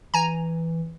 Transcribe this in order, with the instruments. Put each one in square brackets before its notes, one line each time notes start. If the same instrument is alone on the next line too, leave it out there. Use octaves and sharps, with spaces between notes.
[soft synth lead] E3 [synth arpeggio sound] G#5 A#5